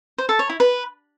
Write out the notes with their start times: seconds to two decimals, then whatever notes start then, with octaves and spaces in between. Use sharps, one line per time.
0.18 C5
0.29 A4
0.39 C#5
0.50 E4
0.60 B4